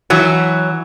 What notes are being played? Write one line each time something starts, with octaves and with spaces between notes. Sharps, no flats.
E3 F#3 F#4